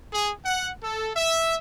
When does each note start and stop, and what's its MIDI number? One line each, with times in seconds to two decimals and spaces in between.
0.12 0.31 68
0.44 0.70 78
0.82 1.10 69
1.14 1.55 76